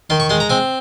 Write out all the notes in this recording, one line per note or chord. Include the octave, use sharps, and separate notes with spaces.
D#3 C6
C#6
G#3 C6
A#5
C4 G#5